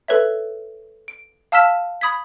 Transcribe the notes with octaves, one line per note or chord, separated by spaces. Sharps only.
A4 B4 C#5 E5
D7
F5 A5 E6 F6 B6 E7
B5 D#6 G#6 B6